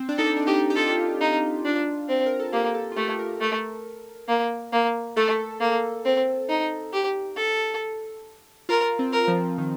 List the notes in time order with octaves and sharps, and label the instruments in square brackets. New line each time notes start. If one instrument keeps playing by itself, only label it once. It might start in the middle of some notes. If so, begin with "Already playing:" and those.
Already playing: [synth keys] C4
D4
[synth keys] D#4 [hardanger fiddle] A4
[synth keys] D4
[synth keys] D#4 [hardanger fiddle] G4
[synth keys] G4
[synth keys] F4 [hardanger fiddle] A4
[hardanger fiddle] D#4
D4
C4
[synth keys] A#4
A4
[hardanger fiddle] A#3 [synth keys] G4
[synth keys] A4
F4
[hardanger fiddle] A3 [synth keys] G4
[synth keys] A#4
[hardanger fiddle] A3
A#3
A#3
[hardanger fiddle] A3 [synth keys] A4
[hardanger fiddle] A#3
C4
D#4
G4
A4
[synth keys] F4 [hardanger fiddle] A#4
[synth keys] C4
[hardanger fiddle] A#4
[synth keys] F3
D#3